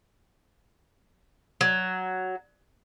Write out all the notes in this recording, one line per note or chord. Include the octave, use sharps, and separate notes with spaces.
F#3